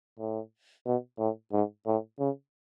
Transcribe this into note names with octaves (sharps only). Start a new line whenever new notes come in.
A2
B2
A2
G#2
A2
C#3